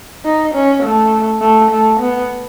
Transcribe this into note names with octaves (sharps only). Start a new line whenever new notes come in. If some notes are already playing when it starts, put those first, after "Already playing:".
D#4
C#4
A3
A3
A3
B3